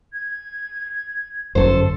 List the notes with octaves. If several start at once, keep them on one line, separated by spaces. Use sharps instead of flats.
G#6
G1 F#2 A4 C5